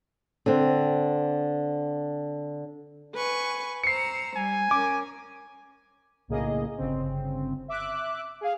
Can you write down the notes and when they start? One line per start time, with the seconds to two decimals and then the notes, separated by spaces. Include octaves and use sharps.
0.46 D3 C4
3.14 B4 G#5 C#6
3.84 C5 A#5 E6 C7 C#7
4.36 G3 G#5
4.71 C#4 A#4 D6
6.28 B1 A2 C#3 A#3 G#4 D#5
6.77 G1 C#3 C4
7.68 E5 D6 F#6
8.41 G#4 F5